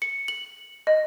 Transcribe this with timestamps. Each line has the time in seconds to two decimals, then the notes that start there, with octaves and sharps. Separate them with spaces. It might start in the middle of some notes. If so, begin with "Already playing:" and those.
0.02 C#7
0.28 F#7
0.87 D#5